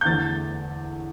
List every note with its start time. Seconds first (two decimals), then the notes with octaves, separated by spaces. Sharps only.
0.01 G6
0.05 E2 D3 A3 A6